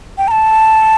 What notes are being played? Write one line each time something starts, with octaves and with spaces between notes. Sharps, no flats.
G5
A#5
A5